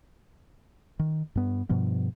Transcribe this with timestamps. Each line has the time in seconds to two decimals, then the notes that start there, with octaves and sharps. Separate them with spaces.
0.99 D#3
1.35 G2 B3
1.69 G2 B2 F3 B3